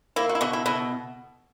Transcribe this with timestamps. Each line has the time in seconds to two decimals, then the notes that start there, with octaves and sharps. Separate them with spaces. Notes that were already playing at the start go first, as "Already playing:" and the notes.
0.16 A#3 E4
0.29 F#4
0.35 E4
0.41 B2 F#4
0.53 E4
0.66 B2 E4